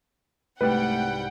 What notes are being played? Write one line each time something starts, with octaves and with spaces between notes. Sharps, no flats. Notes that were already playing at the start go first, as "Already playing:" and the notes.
C2 G#2 G3 A3 B4 F#5 G5